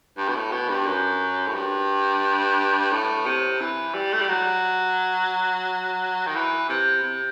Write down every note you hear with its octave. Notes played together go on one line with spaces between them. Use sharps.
G2
B2
A2
B2
G2
F#2
A2
G2
A2
C3
E3
G3
A3
G3
F#3
D#3
E3
C3
C3